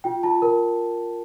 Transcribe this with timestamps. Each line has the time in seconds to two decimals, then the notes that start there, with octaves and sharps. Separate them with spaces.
0.04 F4 G5
0.23 F4 A5
0.42 A#4